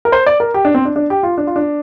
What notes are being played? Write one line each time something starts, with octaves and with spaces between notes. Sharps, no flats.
A#4
C5
D5
A#4
G4
D4
C4
D4
D4
G4
F4
D4
F4
D4